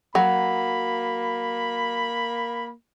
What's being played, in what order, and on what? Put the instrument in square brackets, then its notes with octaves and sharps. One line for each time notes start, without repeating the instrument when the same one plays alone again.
[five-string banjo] F#3 [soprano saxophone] A#3 [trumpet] B5